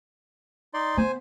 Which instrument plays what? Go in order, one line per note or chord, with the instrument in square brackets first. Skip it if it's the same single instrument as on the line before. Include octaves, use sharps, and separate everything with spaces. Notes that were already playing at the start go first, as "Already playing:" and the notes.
[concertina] D#4 D5 C6
[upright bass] B3 [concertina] C5 G#5